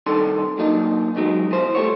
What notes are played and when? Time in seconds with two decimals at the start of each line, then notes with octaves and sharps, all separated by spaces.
0.06 C2 D#3 D4 A4 C6
0.58 F#3 A#3 D4 D#4 F4
1.16 B2 D3 D#3 F#3 G#3
1.51 E3 C5
1.75 G3 A3 F4 C#5